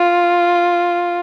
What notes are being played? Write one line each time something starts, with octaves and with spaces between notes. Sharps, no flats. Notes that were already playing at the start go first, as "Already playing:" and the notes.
Already playing: F4